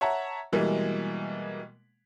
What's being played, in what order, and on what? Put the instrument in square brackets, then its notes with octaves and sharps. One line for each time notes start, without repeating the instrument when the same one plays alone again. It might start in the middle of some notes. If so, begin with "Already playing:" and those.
[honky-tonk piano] C#5 E5 F#5 A5 A#5
B2 E3 G3 G#3 A#3